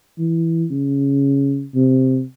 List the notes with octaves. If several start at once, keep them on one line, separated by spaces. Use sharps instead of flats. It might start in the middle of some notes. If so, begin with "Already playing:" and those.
E3
C#3
C3